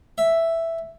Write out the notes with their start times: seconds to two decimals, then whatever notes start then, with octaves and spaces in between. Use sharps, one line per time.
0.18 E5